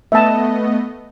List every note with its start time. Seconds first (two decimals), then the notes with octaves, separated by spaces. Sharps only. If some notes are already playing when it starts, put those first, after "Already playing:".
0.12 A3 B3 D#5 E5 A5